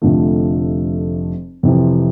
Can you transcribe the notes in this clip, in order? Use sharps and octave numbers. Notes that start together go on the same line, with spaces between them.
F1 F2 D3 F3 A3
F2 C3 E3